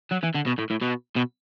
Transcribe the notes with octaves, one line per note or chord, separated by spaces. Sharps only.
F#3
E3
D3
B2
A2
A2
B2
B2